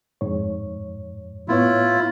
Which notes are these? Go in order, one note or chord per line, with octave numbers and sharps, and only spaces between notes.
F2 G#2 C#5
A2 B3 E4 F4 C#5